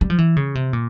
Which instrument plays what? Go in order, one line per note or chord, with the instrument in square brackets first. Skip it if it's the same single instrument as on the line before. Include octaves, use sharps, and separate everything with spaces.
[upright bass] G3
F3
E3
C#3
C3
A#2